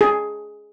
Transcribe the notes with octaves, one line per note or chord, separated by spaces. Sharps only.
G#4